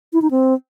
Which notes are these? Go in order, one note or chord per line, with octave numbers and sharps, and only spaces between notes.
E4
D#4
C4